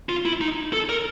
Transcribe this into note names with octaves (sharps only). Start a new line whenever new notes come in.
F4
E4
D#4
A4
A#4